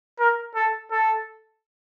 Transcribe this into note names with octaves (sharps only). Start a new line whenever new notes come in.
A#4
A4
A4